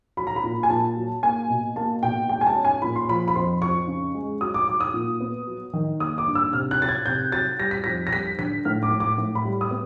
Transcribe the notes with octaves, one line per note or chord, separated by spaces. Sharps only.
F#3 B5
A#5
B5
A#2
G#5
A#2 A5
F#3
A#3 G#5
B2
A#3 A5
B2 G5
G#3 G5
G#5
A5
C#4
G#5
A#2 B5
C6
F3 B5
B5
F2 C6
F2 C#6
C#3
G#3
F#3 D#6
D6
F#3 D6
D#6
A#2
B3
F#3
D#3
A#3 D#6
D6
G2
E6
C3 F6
F#6
F#3 A6
G#6
C3 G6
F#3 A6
G3 A#6
B6
F2 A#6
A#6
G3 B6
D3 B6
A2 F6
D6
A2
D6
A2
B5
G3
D#6
B3